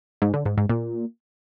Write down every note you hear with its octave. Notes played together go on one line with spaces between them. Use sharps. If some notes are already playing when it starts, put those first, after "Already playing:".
G#2
D3
G#2
G#2
A#2